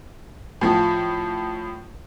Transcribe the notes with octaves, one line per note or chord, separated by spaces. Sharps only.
A2 F3